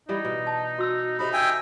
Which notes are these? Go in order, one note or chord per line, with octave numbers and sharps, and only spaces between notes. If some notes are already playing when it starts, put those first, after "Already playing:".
E3 G3 B3 D#4
B2
A5
F#4 E6
C3 D#4 A4 B5
E5 G5 G#5